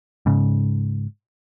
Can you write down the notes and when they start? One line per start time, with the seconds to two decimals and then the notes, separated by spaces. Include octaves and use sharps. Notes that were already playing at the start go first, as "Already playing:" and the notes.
0.26 G#2 C#3